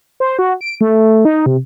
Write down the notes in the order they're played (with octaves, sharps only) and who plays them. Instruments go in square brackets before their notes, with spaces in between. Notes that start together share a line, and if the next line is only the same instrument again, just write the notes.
[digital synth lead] C5
F#4
D7
A3
D#4
C3